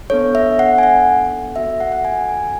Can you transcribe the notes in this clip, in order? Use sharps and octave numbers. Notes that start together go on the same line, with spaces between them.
B3 D4 A4 C#5
E5
F#5
G#5
F#5
B3 F#4 A4 E5
F#5
F#5
G#5
G#5